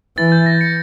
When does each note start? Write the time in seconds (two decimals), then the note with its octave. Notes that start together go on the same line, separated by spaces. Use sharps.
0.18 E3 A6
0.32 G6
0.46 A#6
0.61 C#7